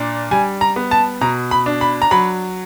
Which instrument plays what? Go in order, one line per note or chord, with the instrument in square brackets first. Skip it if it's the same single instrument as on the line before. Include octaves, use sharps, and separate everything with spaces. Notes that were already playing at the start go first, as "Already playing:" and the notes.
Already playing: [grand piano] A#2 D4
G3 G#5
A#5
B3
A5
B2 A#5
B5
D4
B5
A#5
F#3 B5